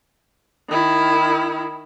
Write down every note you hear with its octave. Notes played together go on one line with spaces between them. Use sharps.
D#3 E4